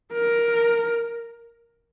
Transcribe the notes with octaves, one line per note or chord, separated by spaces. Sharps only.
A#4